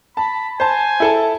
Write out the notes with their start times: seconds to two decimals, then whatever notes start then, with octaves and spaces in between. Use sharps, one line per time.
0.17 A5 B5
0.60 C5 G#5 A5
1.00 E4 A4 A5